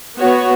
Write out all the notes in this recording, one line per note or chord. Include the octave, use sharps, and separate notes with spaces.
B3 F#4 C#5